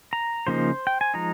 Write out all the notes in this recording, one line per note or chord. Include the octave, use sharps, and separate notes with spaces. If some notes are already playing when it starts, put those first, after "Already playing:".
A#5
C#3 F3 A#3 D#4 C5
G5
G#5
F3 G#3 D#4 A#5